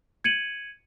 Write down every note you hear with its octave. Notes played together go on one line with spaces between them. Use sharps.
G#6 C#7 D#7 F#7